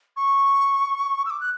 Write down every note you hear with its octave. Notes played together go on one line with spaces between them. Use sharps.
C#6
E6
D6
F#6